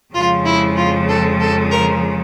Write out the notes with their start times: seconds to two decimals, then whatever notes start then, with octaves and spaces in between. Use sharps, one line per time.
0.14 F2 C#3 F3 G#3 F4
0.45 E4
0.77 F4
1.08 A4
1.40 A4
1.71 A#4